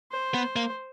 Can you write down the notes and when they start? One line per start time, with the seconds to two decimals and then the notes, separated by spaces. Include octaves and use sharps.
0.12 C5
0.34 B3
0.56 A#3